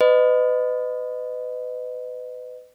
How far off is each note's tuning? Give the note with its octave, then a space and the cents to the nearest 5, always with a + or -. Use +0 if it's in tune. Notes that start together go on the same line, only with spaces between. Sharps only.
B4 +30 D#5 -15